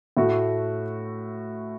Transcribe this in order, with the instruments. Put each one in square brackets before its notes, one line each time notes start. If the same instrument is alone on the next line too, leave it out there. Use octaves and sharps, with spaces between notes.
[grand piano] A2 A3 F#4